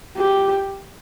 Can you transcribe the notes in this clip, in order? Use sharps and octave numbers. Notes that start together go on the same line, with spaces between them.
G4